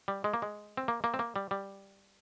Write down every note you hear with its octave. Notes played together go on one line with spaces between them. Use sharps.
G3
G#3
A#3
G#3
C4
A#3
A#3
C4
A#3
G3
G3